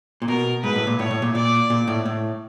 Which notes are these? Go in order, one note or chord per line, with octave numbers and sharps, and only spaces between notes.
A#2
B2 A#4
G#2 B4
A2
A#2
A2 C#5
A2
A#2
A#2 D5
A#2
A2
A2